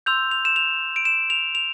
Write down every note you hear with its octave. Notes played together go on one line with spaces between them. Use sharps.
C6 E6 G6 F7
F7
E7
F7
D7
E7
F7
F7